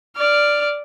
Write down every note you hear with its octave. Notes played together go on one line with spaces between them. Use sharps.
D5 F6